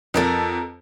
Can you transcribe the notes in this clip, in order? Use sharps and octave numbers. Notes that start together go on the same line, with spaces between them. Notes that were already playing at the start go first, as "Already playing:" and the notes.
F2 A4 A#4 F#5